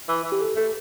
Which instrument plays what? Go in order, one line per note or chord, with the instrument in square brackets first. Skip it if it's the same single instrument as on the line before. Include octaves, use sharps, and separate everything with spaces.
[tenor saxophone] E3
E3
[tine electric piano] G4
A4
[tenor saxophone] A3 [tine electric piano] A4